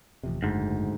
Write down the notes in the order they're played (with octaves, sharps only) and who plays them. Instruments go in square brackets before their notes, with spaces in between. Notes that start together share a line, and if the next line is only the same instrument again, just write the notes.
[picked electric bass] A1 F2 C3
[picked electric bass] F#1 [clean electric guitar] D2 G#2